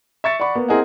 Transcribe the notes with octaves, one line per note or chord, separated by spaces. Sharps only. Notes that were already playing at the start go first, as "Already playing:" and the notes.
E5 C#6 A6 C#7
D5 F#5 B5 C#6
A#3 B3
C4 E4 G#4 A#4 D#5 F#5